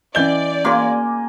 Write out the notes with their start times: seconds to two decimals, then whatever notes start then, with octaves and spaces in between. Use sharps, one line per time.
0.15 E3 C#4 D5 D#5 G6 G7
0.65 A#3 F#4 G#4 G#5 C6